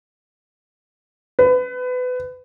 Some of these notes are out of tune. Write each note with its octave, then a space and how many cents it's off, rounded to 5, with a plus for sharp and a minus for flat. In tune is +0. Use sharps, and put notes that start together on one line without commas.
B4 +25